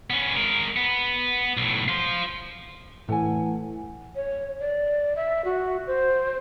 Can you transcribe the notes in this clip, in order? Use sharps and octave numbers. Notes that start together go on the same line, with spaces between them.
B3 C#4
G#3 A#4
B3
B1 A2
F4 C5
A2 E3 A3 A4 F#5 G#5
C#5
D5
E5
F#4
C5